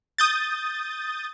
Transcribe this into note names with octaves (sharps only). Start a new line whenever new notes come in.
D#6 G6 A6